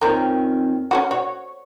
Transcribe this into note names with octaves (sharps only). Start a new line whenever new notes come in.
F2 D#3 C4 C#4 A#4
C#4 D#4 F#4
F#4 C#5